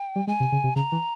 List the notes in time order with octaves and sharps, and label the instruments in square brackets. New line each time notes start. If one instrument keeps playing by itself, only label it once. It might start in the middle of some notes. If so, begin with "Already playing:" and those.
Already playing: [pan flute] G5
[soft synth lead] G3
[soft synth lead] G#3 [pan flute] G#5
[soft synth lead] C3
C#3
C3
[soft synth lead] C#3 [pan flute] A#5
[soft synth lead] E3